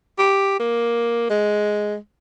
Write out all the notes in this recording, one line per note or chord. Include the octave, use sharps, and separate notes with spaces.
G4
A#3
G#3